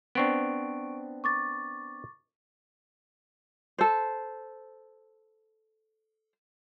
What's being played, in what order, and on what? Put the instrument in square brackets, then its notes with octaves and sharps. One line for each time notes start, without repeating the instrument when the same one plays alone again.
[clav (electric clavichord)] B3 C4 D4 [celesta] C#6 D7
[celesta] C#6 D6 A6
[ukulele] A4 C5